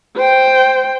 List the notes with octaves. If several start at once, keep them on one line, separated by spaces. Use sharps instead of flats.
C5 G5